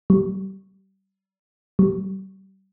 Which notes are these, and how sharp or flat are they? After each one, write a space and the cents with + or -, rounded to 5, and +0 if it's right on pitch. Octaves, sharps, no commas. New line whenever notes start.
G3 -30
G3 -35